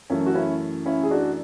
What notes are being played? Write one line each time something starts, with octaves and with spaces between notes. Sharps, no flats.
F#2 E3 A3 C#4
F#4
C#4 E4
C#4 E4
G#4
D4 F#4